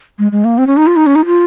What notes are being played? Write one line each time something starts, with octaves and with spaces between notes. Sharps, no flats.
G#3
G#3
A#3
C4
C#4
D#4
F4
D#4
C#4
D#4
F4